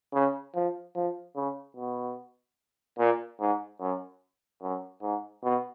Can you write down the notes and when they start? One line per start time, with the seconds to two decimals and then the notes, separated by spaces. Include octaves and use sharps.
0.14 C#3
0.55 F3
0.95 F3
1.36 C#3
1.76 B2
2.98 A#2
3.40 G#2
3.80 F#2
4.62 F#2
5.02 G#2
5.43 B2